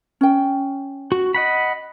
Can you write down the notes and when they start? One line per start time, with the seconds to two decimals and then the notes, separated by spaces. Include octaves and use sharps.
0.21 C#4 G5
1.12 F#4
1.34 D#5 F#5 B5